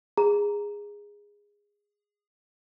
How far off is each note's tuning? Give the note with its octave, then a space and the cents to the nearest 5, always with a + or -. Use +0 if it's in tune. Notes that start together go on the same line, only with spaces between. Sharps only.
G#4 -15 A#5 -5